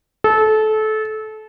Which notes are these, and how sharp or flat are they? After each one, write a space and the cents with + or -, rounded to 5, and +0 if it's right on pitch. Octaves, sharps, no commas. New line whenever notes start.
A4 -25